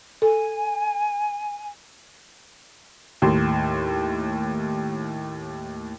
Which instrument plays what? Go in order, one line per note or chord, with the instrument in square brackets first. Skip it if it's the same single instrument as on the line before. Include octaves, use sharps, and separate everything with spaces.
[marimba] A4 [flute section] G#5
[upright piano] D#2 A2 C6